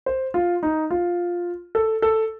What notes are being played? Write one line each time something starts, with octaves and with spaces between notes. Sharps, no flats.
C5
F4
D#4
F4
A4
A4